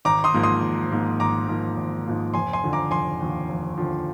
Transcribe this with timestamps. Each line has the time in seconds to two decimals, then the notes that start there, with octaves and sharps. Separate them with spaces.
0.05 G#1 A#5 D6
0.24 C6 D#6
0.34 G#2 F3 A#3
0.43 C6 D#6
0.62 G#1
0.91 G#2 F3 A#3
1.20 G#1 A#5 D6
1.48 G#2 F3 A#3
1.77 G#1
2.06 G#2 F3 A#3
2.34 F1 G#5 C6
2.53 G#5 C6
2.63 D#2 D3 F3
2.73 A#5 D6
2.91 F1 G#5 C6
3.20 D#2 D3 F3
3.49 F1
3.78 D#2 D3 F3